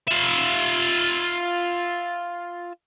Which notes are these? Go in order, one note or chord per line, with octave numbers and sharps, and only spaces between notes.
F4 E5